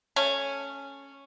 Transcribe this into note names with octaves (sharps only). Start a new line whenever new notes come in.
A3 C#4